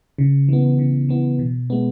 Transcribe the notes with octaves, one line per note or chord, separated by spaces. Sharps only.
C#3
E3 B3
C#3
E3 B3
B2
G#3 B3